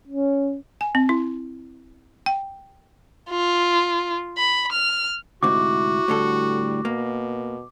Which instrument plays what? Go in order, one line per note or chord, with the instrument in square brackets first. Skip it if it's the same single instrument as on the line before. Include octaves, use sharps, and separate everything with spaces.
[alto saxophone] C#4
[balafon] G#5
C4
E4
G5
[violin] F4
B5
F6
[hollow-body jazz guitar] D2 G#2 C3 [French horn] E4 [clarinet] F#4 [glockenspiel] D6
[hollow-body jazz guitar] A2 D3 A4 [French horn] G3
[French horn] B2 [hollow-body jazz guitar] A#3